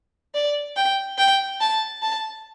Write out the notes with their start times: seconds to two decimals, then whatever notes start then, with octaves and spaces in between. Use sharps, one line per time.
0.34 D5
0.76 G5
1.18 G5
1.61 A5
2.02 A5